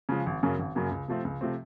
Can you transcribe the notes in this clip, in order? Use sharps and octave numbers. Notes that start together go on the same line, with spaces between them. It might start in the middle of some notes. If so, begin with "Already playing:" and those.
C#3 F3 G#3
G#1
F#2 C#3 F#3 A#3
G#1
F#2 C#3 F#3 A#3
C#2
C3 F3 A3 C4
C#2
C3 F3 A3 C4